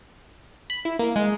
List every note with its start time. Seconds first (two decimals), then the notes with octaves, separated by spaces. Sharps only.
0.70 B5
0.85 E4
0.99 A#3
1.16 G#3